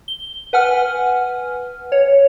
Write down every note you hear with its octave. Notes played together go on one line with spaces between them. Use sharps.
G7
B4 F#5 G#5 F6
C#5